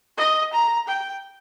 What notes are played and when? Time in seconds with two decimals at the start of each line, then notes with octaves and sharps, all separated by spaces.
0.18 D#5
0.53 A#5
0.87 G5